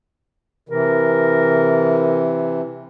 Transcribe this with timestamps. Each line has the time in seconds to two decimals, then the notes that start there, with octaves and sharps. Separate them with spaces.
0.69 C3 E3 A#4